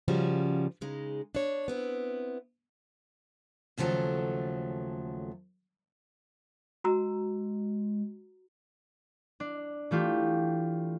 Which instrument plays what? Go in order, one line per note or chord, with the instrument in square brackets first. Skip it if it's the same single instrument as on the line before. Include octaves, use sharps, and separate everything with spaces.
[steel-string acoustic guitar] C#3 F3 G3 C#4 F#4
C#3 G#3 D#4
D4 C#5
B3 C4 E4
D#2 C#3 F3 F#3 A3 A4
[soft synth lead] G#3 [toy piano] F#4 A#5 E6
[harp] D4
E3 A3 F4 G4